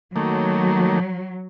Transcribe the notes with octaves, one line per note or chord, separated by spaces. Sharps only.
D#3 F#3 A3 A#3